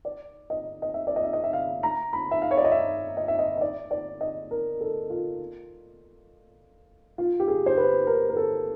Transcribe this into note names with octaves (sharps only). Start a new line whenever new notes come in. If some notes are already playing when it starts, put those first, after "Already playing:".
D5
D#5
D#5
E5
D5
D#5
E5
D#5
E5
F5
A#5
B5
E5
F5
C#5
D5
D#5
E5
D#5
E5
D#5
D#5
D5
D5
D#5
A#4
A4
F4
F4
G4
G#4
C5
B4
A#4
A#4
A4